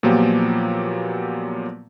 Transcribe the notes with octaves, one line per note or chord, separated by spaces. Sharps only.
A#2 F3 F#3 A#3 B3 G4